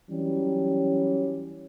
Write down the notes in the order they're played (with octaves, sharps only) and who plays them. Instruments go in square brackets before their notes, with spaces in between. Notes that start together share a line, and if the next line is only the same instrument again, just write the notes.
[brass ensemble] E3 F#3 G3 C#4